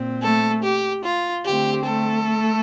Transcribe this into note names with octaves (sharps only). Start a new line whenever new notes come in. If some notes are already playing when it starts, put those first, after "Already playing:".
Already playing: A#2 C4
A3 A4
G4
F4
D3 A3 C4 G4
A3 A4